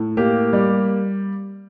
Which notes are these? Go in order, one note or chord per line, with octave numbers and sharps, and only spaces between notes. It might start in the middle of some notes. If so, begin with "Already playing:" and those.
Already playing: A2
A#3 G4
G3